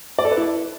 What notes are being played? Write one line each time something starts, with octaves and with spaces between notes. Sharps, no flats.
D5
A4
B4
E4